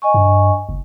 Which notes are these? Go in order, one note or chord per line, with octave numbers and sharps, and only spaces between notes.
D#5 G#5 C#6
G2
F#1